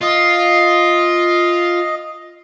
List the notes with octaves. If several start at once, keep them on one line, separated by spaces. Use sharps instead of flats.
F4 D#5